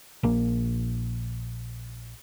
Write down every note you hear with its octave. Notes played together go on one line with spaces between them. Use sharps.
A#1 A#3